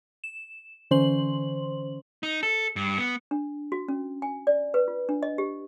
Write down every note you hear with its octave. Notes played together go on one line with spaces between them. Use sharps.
E7
D3 E3 C#4 C5 C6 F#7
D#4
A4
G2
B3
D4
F#4
C#4
G#5
D5
B4
F4
D4
D#5
G4